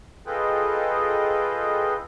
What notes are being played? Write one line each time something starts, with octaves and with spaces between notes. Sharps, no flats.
F4 G#4 A4 B4 D#5 G5